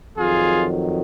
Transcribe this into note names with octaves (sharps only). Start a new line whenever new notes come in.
F2 D#3 F#3 F4 G#4